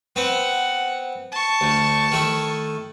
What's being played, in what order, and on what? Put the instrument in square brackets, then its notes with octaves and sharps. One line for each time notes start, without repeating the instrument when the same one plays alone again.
[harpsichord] B3 C4 [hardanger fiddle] F#5
[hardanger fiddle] A5 C#6
[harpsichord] D2
D#3 A3 E4